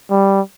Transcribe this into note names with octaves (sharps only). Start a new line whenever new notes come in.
G3